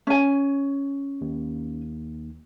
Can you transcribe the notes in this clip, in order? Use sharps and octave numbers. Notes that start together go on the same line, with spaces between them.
C#4 G#5
D#2